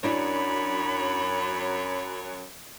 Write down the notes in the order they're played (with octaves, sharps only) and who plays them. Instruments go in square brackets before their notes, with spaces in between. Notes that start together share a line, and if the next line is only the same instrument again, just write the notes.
[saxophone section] F#2 C#5 [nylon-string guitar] D4 E4 [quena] B5